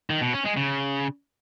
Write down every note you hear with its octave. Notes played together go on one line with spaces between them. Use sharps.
D#3
B2
C#4
G#3
C#3